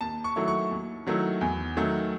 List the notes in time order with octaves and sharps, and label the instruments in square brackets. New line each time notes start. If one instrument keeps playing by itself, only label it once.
[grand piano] D#2 A5
C#6
D#3 F#3 A3 E4
C#6
D#2
D#3 F#3 A3 E4
E2
D#3 F#3 A3